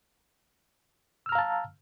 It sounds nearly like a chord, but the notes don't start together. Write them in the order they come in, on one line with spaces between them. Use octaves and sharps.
E6 F6 A#5 F5 A5